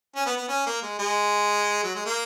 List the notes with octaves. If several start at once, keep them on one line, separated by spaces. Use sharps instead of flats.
C#4
B3
B3
C#4
A#3
G#3
G#3
F#3
G#3
A#3